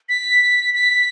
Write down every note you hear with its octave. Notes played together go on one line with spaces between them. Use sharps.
B6
B6